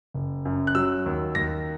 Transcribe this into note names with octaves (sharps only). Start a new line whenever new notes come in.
F#1
F#2
F#6
F#3 E6
D#2
D#2 A#6